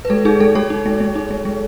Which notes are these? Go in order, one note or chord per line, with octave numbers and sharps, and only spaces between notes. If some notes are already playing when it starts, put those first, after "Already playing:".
B4
G#3 A4
D#4 G#4
G#3 A4
G#3 A4 C#5
D#4
G#3
G#3
D#4
G#3
G#3